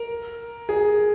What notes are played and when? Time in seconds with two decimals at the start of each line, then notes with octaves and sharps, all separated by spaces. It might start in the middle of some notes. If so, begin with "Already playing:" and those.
Already playing: A#4
0.69 G#4